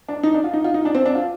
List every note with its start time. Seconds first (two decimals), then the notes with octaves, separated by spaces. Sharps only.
0.08 D4
0.23 D#4
0.34 D4
0.44 F4
0.54 D#4
0.64 F4
0.74 D#4
0.85 D4
0.95 C4
1.06 D4
1.15 F4